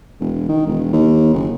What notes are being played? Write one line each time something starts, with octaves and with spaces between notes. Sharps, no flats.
E1
D#3
E1
D#2
F#1